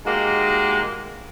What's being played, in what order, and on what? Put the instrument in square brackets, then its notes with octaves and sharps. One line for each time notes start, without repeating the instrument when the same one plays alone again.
[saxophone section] G#3 A#3 D#4 F#4 G4